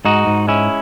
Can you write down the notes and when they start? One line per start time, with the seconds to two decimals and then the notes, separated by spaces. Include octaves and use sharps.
0.05 G#2 D#4 F#4
0.27 G#2
0.47 G#3 C#4 E4